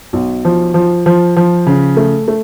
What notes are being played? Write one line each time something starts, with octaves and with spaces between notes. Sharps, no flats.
B1
F3
F3
F3
F3
C#3
A3
A3